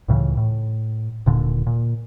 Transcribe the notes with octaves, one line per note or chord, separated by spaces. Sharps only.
C#2 A2 C#3 E3
A2
D#1 A#2 D3
A#2